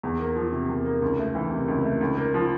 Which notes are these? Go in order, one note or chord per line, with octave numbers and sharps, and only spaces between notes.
E2
A#3
F3
C3
E2
A#3
C#2
A3
E3
C3
C#2
A3
C#2
A#3
F3